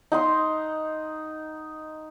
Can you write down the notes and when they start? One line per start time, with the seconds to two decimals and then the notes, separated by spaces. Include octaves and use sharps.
0.12 D#4 F#5 C6